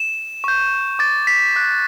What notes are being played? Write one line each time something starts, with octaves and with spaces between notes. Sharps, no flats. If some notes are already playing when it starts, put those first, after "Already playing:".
Already playing: E7
C#6 G6
D6 G6 A6
B6
D6 F#6